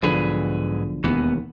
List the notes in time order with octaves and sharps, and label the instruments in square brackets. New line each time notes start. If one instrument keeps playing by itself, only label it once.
[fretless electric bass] B1 D3 F3 [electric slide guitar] G#2 G#4 B4
[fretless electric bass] E1 D#2 [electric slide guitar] E3 B3